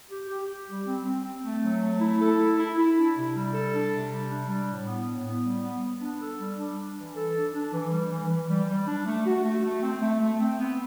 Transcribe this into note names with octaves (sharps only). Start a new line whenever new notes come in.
G4
G4
G4
G3
C4
C4
C4
A3
F#3
A3
E4
A4
E4
E4
E4
D4
C3
G3
A4
D4
C3
G3
D4
G3
A2
B3
A2
B3
G3
B3
B3
D4
A4
G3
D4
D4
E3
A4
D4
D4
E3
G3
E3
E3
G3
G3
D4
A3
F#4
A3
A3
C4
A3
A3
C4
B3